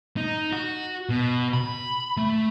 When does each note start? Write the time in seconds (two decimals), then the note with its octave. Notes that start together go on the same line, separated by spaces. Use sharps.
0.17 D#4
0.52 F#4
1.09 B2
1.53 B5
2.17 A3